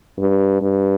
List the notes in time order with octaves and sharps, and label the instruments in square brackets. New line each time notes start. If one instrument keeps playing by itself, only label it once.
[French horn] G2
G2